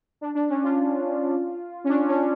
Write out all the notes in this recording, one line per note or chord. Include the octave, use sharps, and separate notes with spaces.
D4
D4
C#4
F4
C#4
D4
C#4